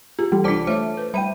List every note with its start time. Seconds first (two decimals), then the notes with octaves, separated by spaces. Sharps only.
0.19 F4 G4 G#4
0.32 E3 G3
0.44 C2 D4 F4 C5 D5 A5 D6 C#7
0.67 A3 C5 C#5 E5
0.97 B4
1.14 G3 E5 G5 B5 D#7